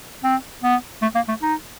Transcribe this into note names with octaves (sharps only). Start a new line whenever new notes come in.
C4
B3
A3
A#3
A3
D#4